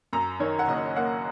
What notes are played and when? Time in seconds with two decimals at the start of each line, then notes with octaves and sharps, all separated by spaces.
0.13 F#2 A#5
0.40 D#3 C#5
0.59 F#5
0.68 F#1 D#5
0.96 A#3 F#5